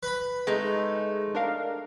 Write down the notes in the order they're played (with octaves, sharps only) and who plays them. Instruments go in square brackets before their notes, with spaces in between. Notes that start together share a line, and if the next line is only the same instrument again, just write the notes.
[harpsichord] B4 B5
[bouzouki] G#3 A3 D#4
[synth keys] D4 A#4 F5